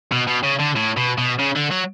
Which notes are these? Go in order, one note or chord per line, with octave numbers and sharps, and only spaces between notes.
B2
B2
C#3
D3
A2
B2
B2
C#3
D3
F#3